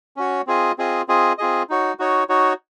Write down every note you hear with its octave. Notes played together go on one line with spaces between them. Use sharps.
C#4 F#4 C#5
C4 F4 G#4 D#5
C4 F4 G#4 D#5
C4 F4 G#4 D#5
C4 F4 G#4 D#5
D#4 F#4 C#5
D#4 F#4 C#5
D#4 F#4 C#5